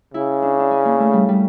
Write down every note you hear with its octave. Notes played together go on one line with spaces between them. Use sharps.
C#3 E4
D4
D4
C#4
A#3
A3
G3
G3